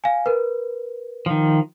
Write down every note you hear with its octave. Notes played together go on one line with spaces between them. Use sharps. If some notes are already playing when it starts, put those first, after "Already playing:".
F5 G#5
A#4 B4
D#3 F3